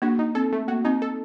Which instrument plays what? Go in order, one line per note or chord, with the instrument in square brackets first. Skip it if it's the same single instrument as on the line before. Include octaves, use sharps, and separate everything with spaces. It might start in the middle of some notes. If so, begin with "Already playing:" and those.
[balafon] A#3 D4 [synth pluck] F#4
[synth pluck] D#4
[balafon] C4 [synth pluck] A4
[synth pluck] A3
[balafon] A#3 [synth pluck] F#4
[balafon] C4 [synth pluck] D#4
[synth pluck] A4